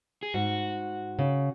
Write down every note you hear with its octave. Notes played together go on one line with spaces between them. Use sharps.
G#4
G#2 F#4
C#3